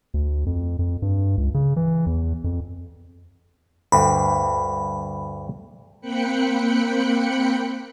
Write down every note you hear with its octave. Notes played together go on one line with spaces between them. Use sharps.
D2
F2
F2
G2
C#2
C#3
E3
E2
F2
D2 G2 B5
A#3 C4 G5 B5 F#6 C#7